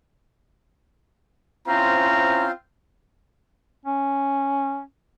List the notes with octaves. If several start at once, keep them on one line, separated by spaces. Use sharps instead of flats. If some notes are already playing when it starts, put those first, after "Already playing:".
C4 C#4 E4 F4 C5 A#5
C#4